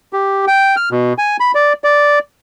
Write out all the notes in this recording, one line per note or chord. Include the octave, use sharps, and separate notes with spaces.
G4
G5
F6
B2
G#5
B5
D5
D5